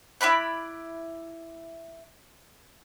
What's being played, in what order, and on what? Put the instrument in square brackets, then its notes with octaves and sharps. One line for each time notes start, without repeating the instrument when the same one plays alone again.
[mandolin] E4 D5 B5 F#6